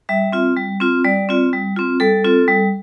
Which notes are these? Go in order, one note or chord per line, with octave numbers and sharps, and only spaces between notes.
G3 E5
C4 F4
G3
C4 F4
G3 D5
C4 F4
G3
C4 F4
G3 A4
C4 F4
G3